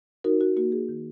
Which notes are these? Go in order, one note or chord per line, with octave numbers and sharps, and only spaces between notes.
D#4 F#4 A#4
F#4
A#3 F#4
G#4
D#3